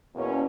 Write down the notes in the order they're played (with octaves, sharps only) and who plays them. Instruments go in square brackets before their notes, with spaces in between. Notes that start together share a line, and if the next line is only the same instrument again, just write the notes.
[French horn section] E2 B2 A#3 C#4